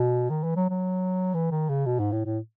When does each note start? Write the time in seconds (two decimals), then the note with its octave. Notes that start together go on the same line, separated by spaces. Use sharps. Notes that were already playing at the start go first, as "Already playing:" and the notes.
Already playing: B2
0.30 D#3
0.43 E3
0.56 F#3
0.70 F#3
1.34 E3
1.51 D#3
1.69 C#3
1.86 B2
1.99 G#2
2.12 A2
2.25 A2